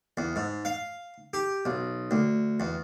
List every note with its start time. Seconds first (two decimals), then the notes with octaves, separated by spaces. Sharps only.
0.17 E2
0.36 G#2
0.65 F5
1.34 G4
1.65 B1
2.11 D2
2.60 E2